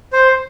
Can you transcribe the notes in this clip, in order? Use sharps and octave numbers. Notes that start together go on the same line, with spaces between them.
C5